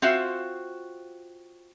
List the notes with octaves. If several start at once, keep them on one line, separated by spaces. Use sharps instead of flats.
C4 F4 F#4 C5 E5